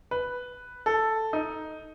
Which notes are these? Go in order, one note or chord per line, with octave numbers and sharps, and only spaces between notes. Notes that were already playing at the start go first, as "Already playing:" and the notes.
B4
A4
D#4